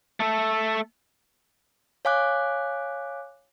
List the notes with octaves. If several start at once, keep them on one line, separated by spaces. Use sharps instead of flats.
A3 A4
C#5 F5 G#5 D6 F#6